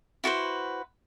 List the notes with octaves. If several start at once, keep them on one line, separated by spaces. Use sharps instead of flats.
E4 F#4 B4 C5